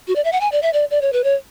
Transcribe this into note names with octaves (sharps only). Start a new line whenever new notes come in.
F#4
D5
E5
F#5
G#5
D5
E5
D5
D5
C#5
B4
C#5